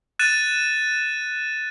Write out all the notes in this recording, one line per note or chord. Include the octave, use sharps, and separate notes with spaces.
F#6 A6 D#7 E7